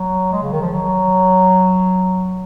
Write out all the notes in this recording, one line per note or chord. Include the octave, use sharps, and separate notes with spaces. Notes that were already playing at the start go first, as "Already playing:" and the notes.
Already playing: F#3
G#3
C#3
D#3
F3
F#3